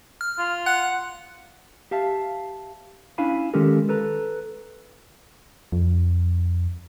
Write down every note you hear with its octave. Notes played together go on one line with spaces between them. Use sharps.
F6
F4
F#5 F#6
G4 E5 F5 A5
C#4 D4 E4 F5 G#5 B5
D#3 G#3 C#4 G4 A4 A#4
A4 B4 A#5
F2